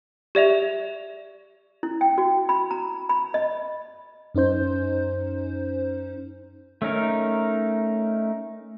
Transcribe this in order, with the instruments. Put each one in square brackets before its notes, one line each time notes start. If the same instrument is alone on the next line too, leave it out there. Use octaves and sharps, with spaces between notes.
[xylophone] G4 D5 E5 F7
[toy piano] E4
G5
F#4
B5
A#5
B5
D#5
[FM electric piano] F#2 C#4 D#4 C5 G6
[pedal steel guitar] A3 C#4 D#4 A#4